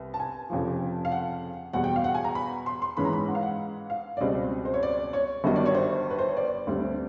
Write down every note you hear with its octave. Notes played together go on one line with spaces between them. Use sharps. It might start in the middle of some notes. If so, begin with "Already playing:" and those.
Already playing: C2 B3
A5
G#5
F1 F2 C#3 F3
F5
F#5
E2 B2 G3 F#5
G5
F5
F#5
G#5
A#5
B5
C6
C6
G#2 E3 G#3 C#4 B5
A#5
B5
F#5
F5
F#5
F5
D5
C#2 B2 G3 C4 D#5
C5
C#5
D5
C#5
G1 G2 D#3 F#3 D#5
D5
C#5
C5
B4
C5
C#5
D5
D2 D3 G3 C4